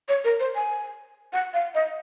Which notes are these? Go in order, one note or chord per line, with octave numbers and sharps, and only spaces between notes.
C#5
A#4
C5
G#5
F#5
F5
D#5